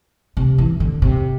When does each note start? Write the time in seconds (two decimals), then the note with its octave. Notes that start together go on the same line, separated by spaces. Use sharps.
0.37 C3
0.58 E3
0.80 D3
1.02 C3